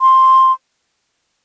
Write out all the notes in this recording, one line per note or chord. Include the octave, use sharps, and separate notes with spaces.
C6